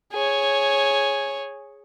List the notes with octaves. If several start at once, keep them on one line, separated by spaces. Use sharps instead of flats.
G#4 C#5